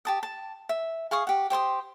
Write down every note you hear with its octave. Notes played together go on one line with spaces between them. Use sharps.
G4 A5 D#6
A5
E5
G#4 F5 C#6 D#6
G4 F#5
G4 C5 C6 D#6